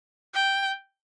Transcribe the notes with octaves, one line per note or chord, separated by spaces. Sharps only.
G5